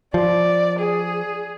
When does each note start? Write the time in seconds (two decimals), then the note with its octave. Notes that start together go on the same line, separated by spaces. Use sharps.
0.14 F3 D5
0.80 G#4